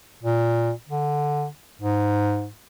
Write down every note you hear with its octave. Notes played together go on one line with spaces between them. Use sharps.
A#2
D3
G#2